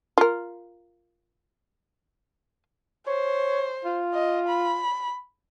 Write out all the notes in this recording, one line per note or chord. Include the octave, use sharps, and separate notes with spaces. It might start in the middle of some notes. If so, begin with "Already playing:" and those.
F4 A#4
C5 C#5
F4
D#5
B5